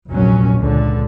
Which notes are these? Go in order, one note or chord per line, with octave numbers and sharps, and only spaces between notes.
F1 A#1 D#2 A#2 F#3 C#4
C#2 A#2 D3